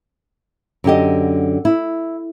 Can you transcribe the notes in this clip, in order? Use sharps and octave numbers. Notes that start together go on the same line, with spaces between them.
F#2 D3 G4 D#5
E4